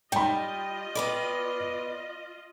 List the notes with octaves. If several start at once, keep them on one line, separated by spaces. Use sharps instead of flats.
G3 F4 D#5 G5 B5
B3 B4 D5